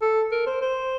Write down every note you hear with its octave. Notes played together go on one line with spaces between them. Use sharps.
A4
A#4
C5
C5